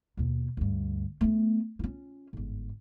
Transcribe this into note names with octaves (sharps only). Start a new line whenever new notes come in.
D#2 B2
D2 G2
A3 B3
C#4 F4
G1 G#2